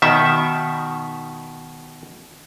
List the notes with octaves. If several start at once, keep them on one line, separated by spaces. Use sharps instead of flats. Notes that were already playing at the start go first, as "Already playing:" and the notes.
B2 D#3 E5